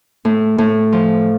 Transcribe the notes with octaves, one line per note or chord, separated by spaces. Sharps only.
A2
A2
F3